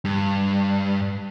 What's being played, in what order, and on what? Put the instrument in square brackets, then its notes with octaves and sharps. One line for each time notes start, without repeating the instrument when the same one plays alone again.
[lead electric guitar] G2